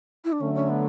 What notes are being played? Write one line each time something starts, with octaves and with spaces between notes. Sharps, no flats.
E4
D4
D3 F#3 A3 C#4
C#4
B3